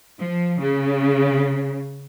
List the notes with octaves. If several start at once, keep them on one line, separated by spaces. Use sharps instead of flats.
F3
C#3